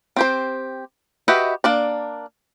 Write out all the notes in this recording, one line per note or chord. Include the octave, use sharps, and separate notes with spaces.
C4 G4 C5
F#4 G4 B4 D#5 E5
A#3 D4 D5